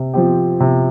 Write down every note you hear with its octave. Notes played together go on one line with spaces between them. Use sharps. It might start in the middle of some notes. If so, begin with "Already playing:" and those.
Already playing: C3
F3 C4 G4
C3